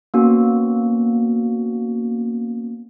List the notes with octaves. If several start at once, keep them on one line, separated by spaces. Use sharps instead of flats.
A#3 B3 C#4 F#4